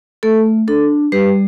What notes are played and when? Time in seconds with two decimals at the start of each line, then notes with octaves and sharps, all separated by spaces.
0.23 A3 A4
0.68 D4 A4
1.12 G3 G4 B4